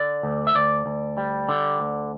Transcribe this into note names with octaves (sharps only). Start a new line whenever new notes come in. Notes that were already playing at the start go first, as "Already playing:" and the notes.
Already playing: D3 D5
D2
E5
D2 D5
D2
G3
D3
D2